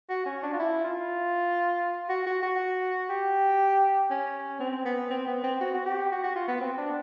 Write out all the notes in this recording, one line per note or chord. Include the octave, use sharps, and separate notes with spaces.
F#4
C#4
D4
F4
E4
F4
F#4
F#4
F#4
G4
C#4
C4
B3
C4
B3
C4
F#4
F#4
G4
F#4
F#4
F4
B3
C4
D4